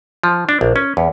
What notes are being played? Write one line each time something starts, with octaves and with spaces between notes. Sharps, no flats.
F3
D4
A#1
C#4
E2